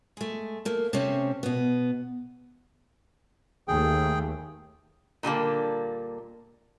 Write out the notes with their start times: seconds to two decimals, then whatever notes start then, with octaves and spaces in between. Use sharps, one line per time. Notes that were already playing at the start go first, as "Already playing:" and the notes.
0.17 G#3 A3
0.65 A3 A#3
0.93 C3 A3 C4 C#4
1.43 B2 B3
3.68 D#2 A3 G#4 G5
5.23 A#2 D3 G3 A#3